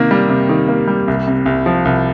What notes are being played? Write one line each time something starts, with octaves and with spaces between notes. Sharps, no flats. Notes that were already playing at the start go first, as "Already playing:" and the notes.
Already playing: C3 D#3 A#3
G3
C3
D#3
A#3
G3
C2
C3
C2
F3
C2